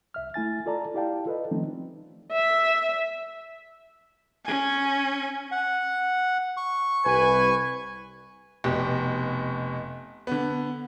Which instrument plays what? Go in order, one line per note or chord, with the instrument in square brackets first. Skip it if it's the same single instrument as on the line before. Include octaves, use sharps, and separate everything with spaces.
[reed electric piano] C2 E5 F6
A3 E4 G#5 A6
F4 A4 D5 A5 A#5
E4 G4 D5 F5 G5 A5
F4 A4 B4 D#5
D#3 F3 A3 C4 C#4 D#4
[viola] E5
[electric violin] C#4 G#5
[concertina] F#5
C#6
[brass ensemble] C2 B4 G#5
[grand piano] F1 B2 G4
D3 B3